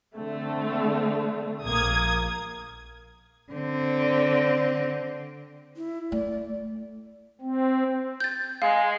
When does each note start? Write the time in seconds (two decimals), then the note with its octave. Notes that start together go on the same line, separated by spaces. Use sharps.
0.15 D3 A3 C4
1.63 A#1 A#3 D#6 G#6
3.52 D3 C4
5.77 E4
6.12 A3 D5
7.41 C4
8.20 G6 A6
8.62 G#3 F5